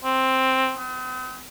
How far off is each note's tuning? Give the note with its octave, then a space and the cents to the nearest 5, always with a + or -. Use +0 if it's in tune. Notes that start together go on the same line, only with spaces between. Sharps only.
C4 +5
C4 -45